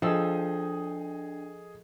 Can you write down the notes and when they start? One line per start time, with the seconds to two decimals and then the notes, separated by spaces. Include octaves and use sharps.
0.02 F3 D4 G#4 A4 D#5 G5 A#5 E6